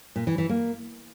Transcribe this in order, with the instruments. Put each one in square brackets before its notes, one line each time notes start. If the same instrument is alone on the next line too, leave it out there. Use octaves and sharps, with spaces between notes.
[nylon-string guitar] A#2
E3
E3
A#3